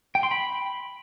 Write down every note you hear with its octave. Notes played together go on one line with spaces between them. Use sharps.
G5
C6
B5